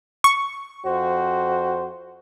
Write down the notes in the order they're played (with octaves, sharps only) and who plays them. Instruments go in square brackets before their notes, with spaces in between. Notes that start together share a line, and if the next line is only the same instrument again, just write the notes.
[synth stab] C#6
[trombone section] F2 F#4 C5